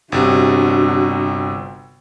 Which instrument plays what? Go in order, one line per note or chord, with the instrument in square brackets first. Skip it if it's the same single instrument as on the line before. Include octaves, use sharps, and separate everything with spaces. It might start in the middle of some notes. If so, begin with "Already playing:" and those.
[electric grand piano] G1 C3 [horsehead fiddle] D4 F#4